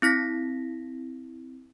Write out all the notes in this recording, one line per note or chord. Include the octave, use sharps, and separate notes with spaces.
C4 E4 A#6 B6